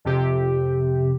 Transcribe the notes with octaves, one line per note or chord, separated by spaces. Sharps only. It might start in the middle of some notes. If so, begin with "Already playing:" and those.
F2 C3 G4